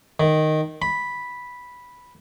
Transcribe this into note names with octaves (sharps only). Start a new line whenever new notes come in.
D#3
B5